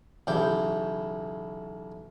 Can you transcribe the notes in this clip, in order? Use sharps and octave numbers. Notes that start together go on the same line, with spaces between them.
B1 C#3 E3 E4 G4 G5